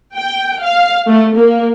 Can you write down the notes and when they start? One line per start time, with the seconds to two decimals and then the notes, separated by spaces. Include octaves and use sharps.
0.15 G5
0.62 F5
1.07 A3
1.37 A#3